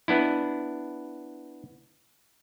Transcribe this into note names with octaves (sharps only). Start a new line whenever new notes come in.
B3 D4 E4